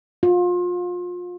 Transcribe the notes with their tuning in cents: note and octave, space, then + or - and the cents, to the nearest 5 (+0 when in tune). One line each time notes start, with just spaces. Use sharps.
F4 +30